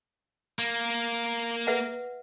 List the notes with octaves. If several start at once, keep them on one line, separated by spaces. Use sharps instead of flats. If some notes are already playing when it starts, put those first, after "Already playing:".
A#3
B4 E5 F#5